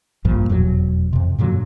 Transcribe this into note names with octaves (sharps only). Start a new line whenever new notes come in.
A#1 G2 A#2 F3
F1 E2 B2 F#3
F2 C3
G2 A#2 D3 F#3